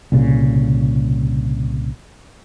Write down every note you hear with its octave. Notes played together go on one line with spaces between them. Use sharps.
C2 A#2 C#3